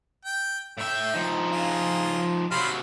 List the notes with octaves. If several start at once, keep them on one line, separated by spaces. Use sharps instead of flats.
G5
A2 E5 G5
F3 D#4
F4 G#4
C3 F#3 C5 F5 B5